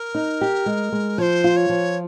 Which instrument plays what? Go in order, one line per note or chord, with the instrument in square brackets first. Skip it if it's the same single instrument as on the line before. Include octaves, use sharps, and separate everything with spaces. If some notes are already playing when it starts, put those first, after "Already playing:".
Already playing: [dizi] A#4
[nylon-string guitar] D#4
G4
G#3
G#3
[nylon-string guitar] F3 [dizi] C#5
[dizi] C5
[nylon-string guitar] F4
[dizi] C#5
[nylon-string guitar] F3